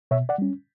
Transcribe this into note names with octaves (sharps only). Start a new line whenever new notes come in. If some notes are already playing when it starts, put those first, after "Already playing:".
B2 C#5 E5
D5 F#5
G3 C#4